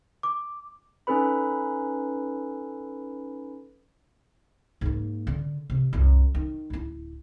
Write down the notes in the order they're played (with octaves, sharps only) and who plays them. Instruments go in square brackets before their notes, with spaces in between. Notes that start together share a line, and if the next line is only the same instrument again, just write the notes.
[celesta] D6
[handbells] C#4 D#4 A4 B4 B5
[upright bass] G#2 A#3
D3
C3
C2 F#2
D#3
D1 E4